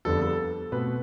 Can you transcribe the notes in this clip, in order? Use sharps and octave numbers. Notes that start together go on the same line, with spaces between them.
F2 D3 G3 B3 A4
A4
B2 A3 C4 B4